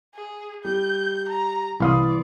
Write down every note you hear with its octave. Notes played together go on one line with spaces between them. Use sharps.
G#4
G3 G6
A#5
C2 E3 D5 F5 B5 C6 D#6